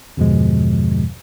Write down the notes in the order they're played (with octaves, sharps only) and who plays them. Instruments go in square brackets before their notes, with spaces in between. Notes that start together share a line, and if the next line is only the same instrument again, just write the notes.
[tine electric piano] E2 G2 B2 D3 F3 G#3